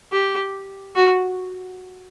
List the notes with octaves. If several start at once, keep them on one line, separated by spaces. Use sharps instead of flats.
G4
F#4